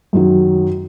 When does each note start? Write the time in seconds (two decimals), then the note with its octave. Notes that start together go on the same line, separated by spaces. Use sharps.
0.13 F#2 D#3 F#3